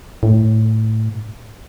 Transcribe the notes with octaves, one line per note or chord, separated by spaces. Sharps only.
A2